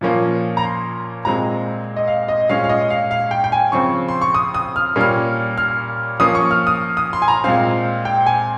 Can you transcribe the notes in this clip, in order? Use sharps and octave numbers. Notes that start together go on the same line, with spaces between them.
A#2 F3 A#3 C#4
A#5
C6
A#2 G#3 C4 A#5
D#5
F5
D#5
A#2 G#3 C#4 F5
F5
D#5
F5
F5
G5
G5
G#5
C#3 F3 C4 C#6
C6
C#6
D#6
D#6
F6
A#2 G3 A#3 C#4 F6
F6
F3 A#3 C#4 D#6
C#6
F6
D#6
D#6
C6
G#5
A#5
A#2 G#3 C4 F5
G5
G#5